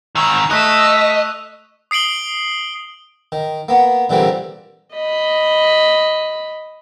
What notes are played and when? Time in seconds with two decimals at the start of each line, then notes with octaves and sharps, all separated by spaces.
0.15 G#2 D#3 C#6 E6 F7
0.51 A3 D#5 E6 F#6 B6
1.91 D#6 C7 D7 F#7 G7
3.32 D#3
3.69 A#3 B3
4.10 A#2 D3 E3 G3 A#3 C4
4.93 D#5 B5